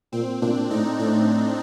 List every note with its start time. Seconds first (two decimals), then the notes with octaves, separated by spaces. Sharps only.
0.13 A#2 C4
0.42 A#2 D4
0.70 A2 D#4
0.99 A2 D4